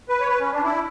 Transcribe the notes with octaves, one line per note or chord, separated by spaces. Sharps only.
B4
C#5
B4
C#4
D4
E4